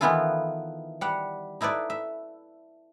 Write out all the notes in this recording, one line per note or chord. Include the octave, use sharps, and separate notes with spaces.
D#3 E3 B3 E4 F4 A4
G3 F#5
D#4 E4 A4 B4 D5
E5